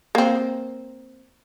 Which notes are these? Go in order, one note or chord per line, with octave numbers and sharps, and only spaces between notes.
A#3 C4